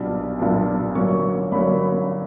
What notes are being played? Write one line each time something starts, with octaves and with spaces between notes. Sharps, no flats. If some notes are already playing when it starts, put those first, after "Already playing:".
Already playing: B1 A#2 G3 B3 D4
B1 A#2 G3 B3 D4
G1 G2 F#3 A#3 C#4 C#6
G1 G2 F#3 A#3 C#4 B5